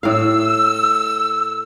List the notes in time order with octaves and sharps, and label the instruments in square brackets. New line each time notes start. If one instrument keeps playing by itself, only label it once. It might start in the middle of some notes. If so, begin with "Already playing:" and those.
[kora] A2 F5 [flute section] E6